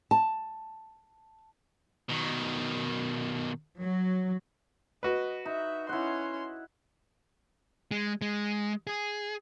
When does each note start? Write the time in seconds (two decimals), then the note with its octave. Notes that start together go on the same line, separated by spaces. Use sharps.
0.11 A5
2.09 B2 D#3
3.78 F#3
5.03 F#4 B4 D#5
5.46 D#4 E5
5.89 C#4 E4 F#5 C6
7.91 G#3
8.22 G#3
8.87 G#4